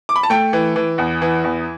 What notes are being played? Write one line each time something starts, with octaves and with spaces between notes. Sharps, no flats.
D6
B5
A5
A3 G5
E3
E3
E2
E3
E2